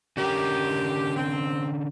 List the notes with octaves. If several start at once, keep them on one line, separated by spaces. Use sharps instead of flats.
D3 C#4 G4 A#4
C4